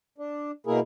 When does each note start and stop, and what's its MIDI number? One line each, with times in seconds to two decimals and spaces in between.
0.18 0.51 62
0.67 0.80 47
0.67 0.80 58
0.67 0.80 64
0.67 0.80 68
0.67 0.80 70